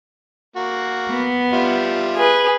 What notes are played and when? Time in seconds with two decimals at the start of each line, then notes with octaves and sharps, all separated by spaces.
0.56 A#3 F#4
1.10 B3
1.53 G3 F4 E5
2.16 G#4 B4